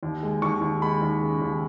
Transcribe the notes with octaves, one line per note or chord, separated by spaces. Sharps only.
D#2
G#3
D#2 C#6
D#2
G#3 B5
D#2
C#3
D#2